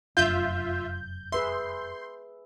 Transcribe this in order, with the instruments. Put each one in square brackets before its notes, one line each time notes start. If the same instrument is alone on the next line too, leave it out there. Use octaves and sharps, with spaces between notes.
[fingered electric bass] F1 F#2 D4 [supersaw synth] F4 E5 [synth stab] G6
[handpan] G#4 B4 E5 [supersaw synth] C6